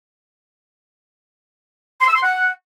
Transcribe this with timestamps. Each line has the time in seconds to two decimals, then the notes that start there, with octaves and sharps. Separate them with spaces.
2.01 C6
2.08 E6
2.16 C6
2.23 F#5